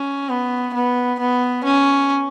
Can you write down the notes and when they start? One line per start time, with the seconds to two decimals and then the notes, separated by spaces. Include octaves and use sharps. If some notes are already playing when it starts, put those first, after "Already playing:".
Already playing: C#4
0.29 B3
0.74 B3
1.19 B3
1.64 C#4